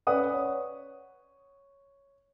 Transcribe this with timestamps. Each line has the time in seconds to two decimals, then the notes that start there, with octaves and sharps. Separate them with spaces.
0.07 C#4 B4 D5 F#5 D#6
0.34 C#5